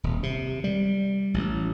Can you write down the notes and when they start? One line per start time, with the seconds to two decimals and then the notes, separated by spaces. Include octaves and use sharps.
0.04 D#1
0.23 C3
0.64 G3
1.34 A1